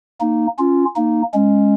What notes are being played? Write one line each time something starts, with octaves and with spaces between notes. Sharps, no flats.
A#3 D#4
C#4 F4
A#3 D#4
G#3 C#4